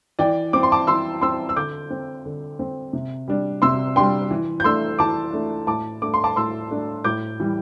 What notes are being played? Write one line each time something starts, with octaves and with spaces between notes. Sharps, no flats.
E3 D5 G5
C4 D6
C6
A5 D6
E3 C6 E6
C4 C6 E6
E6
D3 D6 G6
C4
D3
C4
C3
G3 D4
C3 C6 E6
G3 D4 G5 C6
E3
G6
A3 D4 C6 E6
E3 A5 D6
A3 D4
A2 A5 D6
A3 D4 D6
C6
A5 D6
A2 C6 E6
A3 D4
A2 D6 G6
E3 G3